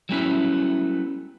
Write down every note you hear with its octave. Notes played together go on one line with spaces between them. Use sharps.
F#3 G3 A3 B3 C#4 E4